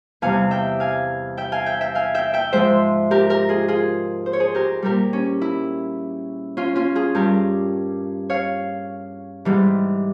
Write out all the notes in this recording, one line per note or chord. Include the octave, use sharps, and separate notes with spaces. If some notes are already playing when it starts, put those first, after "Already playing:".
E2 C3 G3 F5 G#5
E5 G5
F5 G#5
E5 G5
F5 G#5
E5 G5
E5 G5
F5 G#5
E5 G5
E5 G5
G#2 F3 G#3 C5 E5
G4 A#4
G4 A#4
F4 G#4
F4 G#4
C5
C#5
G#4 C5
G4 A#4
A#2 G3 G4 A#4
C#4
E4
C#4 F4
C#4 F4
F4 G#4
G2 G3 G4 A#4
C#5 F5
G#2 E3 G3